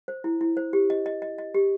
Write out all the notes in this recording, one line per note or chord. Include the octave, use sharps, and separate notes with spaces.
C5
E4
E4
C5
G4
D#5
D#5
D#5
D#5
G4